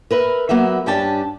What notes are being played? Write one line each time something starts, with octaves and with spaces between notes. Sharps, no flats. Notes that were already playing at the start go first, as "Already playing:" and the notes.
A#4 B4 E5
F#3 A#3 B3 E5
G2 C#4 D4 G4 A5